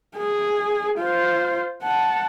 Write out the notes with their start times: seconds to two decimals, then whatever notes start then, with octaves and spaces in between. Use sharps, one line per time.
0.17 G#4
0.98 F4 C5
1.83 F#5 A5